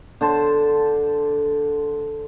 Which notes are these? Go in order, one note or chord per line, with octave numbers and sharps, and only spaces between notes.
D3 C5 A5 C6